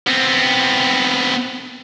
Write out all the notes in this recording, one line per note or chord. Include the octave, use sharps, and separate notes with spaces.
B3 C4